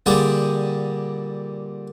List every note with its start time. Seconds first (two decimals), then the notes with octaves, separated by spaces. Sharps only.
0.06 A#2 D3 G3 G4 G#4 D#6